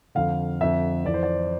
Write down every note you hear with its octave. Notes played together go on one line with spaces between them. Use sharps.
F2 D3 F5
F2 D3 E5
F2 E3 D5
C5
D5